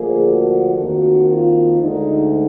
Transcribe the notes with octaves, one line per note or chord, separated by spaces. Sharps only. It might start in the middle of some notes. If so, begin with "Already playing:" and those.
Already playing: D2 D3 F3 A#3 G#4
F#4
F2 D#3 A#3 F#4
F4
D2 D3 G#3 D#4